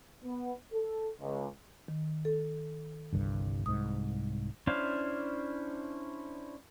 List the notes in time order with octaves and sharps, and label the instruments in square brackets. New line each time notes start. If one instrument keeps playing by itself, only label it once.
[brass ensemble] B3
A4
C#2
[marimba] D#3
A4
[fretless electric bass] G1 C2 G2
[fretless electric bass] C2 G#2 [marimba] D#6
[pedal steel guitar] C#4 D4 E4 C5 F5